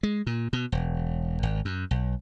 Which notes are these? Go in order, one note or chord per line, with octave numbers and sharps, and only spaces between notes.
G#3
A#2
B2
E1
G#1
F#2
B1